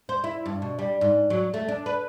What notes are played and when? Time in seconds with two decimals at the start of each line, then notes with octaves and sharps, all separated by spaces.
0.09 C5
0.24 E4
0.46 G2
0.62 B2
0.79 G3
1.01 G#2
1.30 F#3
1.54 A3
1.68 D4
1.86 B4